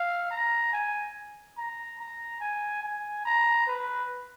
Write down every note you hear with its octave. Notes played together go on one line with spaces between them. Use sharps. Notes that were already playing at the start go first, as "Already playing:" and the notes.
Already playing: F5
A#5
G#5
A#5
A#5
G#5
G#5
A#5
B4